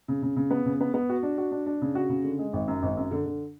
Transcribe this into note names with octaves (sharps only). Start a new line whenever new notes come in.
C#3
C#3
C#3
B3
C#3
B3
B3
F#4
D4
F#4
D4
D4
C#3
F#4
C#3
D3
G#3
G#1
F#2
G#1
F#2
D3
D3